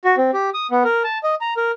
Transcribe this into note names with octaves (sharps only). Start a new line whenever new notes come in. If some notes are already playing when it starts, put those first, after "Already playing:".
F#4
C4
G4
D#6
B3
A#4
A5
D#5
A#5
A#4